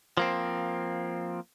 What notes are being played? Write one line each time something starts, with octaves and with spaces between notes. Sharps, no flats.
F3 A#3 C4